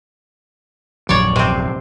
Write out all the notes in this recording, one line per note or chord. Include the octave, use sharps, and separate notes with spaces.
D#1 A#1 F#2 C#5 D5
C3 C4